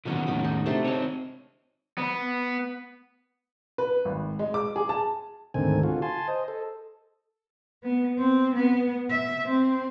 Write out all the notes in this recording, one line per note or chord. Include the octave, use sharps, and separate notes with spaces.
D3 D#3 F#3 B3 C#4 F#4
E2 A2 D#3 G#3 A#5 B5
D#4
C3 A3 D4 C6
C4 D#4 C#5 A5
B3
B4
G#1
G#3
D6
G#4
A5
D2 G#2 D3 D#3 C4 G#5
D3 F4 F#4
G#5 A5 C6
C5 D#5
A4
B3
C4
B3
E5
C4